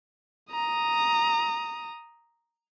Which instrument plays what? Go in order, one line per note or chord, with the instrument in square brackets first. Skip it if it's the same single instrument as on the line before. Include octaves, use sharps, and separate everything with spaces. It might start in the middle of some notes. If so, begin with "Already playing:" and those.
[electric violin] A#5 D#6